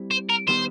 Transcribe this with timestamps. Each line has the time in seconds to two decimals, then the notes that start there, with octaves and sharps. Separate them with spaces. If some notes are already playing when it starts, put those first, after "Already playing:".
Already playing: G3 C4 E4
0.11 C5
0.29 A#4
0.47 D#3 G3 B3 C5